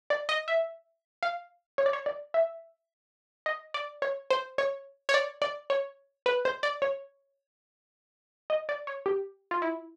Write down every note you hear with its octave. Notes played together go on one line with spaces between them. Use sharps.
D5
D#5
E5
F5
C#5
D5
C#5
D5
E5
D#5
D5
C#5
C5
C#5
C#5
D5
D5
C#5
B4
C5
D5
C#5
D#5
D5
C#5
G4
F4
E4